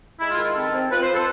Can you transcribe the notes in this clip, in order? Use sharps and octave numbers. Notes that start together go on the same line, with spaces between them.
G#3 E4
F4
D#3
C4 A4
C4
F3 B4
C5
A4